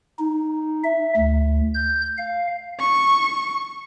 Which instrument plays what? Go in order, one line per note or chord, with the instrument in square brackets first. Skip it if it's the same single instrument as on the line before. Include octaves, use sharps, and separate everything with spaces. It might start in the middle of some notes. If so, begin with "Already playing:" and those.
[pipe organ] D#4
E5
D2
G6
F5
[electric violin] C#6